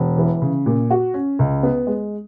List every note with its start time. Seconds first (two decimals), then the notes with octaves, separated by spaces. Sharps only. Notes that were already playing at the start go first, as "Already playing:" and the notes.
Already playing: E1
0.18 E3
0.42 C#3
0.66 A#2
0.91 F#4
1.14 C#4
1.39 C#2
1.63 B3
1.87 G#3